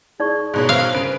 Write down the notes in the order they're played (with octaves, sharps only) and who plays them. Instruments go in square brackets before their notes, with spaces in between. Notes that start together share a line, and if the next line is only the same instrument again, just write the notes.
[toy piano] D#4 D5 C#6 [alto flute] G#4
[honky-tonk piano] G#2 B2 C#5
[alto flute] C5 [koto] F5
[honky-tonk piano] C#3 B4 D7